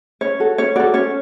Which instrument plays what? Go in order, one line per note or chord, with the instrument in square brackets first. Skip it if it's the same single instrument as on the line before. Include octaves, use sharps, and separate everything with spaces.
[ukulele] C#4 C#5
F#4 A4
C#4 C#5
F#4 A4 D5
C#4 C#5